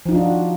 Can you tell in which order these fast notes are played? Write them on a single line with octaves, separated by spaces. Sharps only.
F3 D#4 F4 D4 F#4